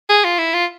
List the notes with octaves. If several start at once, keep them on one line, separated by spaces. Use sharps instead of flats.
G#4
F4
E4
F4